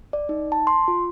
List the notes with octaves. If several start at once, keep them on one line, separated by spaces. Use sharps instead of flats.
D5
D#4
A5
C6
F4